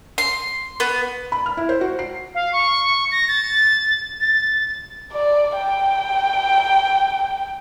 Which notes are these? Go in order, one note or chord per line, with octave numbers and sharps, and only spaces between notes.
C6
B3
B5
F6
E4
C5
F#4
C7
F5
C#6
A#6
A6
A6
D5
G5